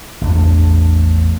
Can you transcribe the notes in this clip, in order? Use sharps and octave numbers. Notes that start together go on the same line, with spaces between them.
A1 E2 D4